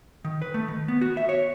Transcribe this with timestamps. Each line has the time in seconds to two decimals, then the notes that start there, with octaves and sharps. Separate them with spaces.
0.25 D#3
0.42 B4
0.54 A3
0.68 D#3
0.88 B3
1.01 F#4
1.17 E5
1.29 C#5